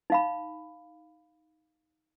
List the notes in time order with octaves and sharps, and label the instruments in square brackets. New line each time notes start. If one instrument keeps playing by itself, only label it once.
[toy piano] D#4 F5 B5